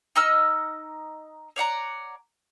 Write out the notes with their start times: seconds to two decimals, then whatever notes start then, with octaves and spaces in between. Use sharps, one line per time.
0.16 D#4 D#5 E6 F6
1.56 C#5 D5 F#5 A#5